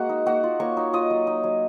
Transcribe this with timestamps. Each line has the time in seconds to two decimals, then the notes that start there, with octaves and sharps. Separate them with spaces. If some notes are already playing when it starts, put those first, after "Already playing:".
Already playing: G#3 A#3 F#4 F#5
0.09 D#4
0.26 A#3 F#4 F#5
0.44 F4
0.60 A#3 C#5 C#6
0.77 D#4
0.93 F4 D#5 D#6
1.10 F#3
1.27 D#4
1.44 F#3